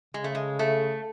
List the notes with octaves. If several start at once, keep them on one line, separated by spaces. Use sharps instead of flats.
C#3 G#3
A3
G#3
A3